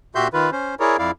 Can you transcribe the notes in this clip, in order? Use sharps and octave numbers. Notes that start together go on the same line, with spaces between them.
A#2 F#4 G4 E5 C6 G6
D#3 F4 B4
C#4 C5
E4 G#4 A#4 C#5 D5
F2 E4 D5 F5